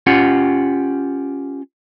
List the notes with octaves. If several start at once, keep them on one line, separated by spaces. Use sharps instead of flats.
C#4 F4 G4 F#5